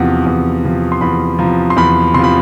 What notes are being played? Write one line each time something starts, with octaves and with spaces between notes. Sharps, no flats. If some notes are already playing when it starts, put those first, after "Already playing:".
Already playing: E2 C3 F3 F#5
E2
C3 F3
C6
E2 B5
C3 F3 A#5
C6
E2 B5
C3 F3 B5 C6